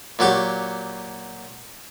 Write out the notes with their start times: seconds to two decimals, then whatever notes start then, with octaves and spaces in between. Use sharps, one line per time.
0.19 A#2 F#3 G4 C#6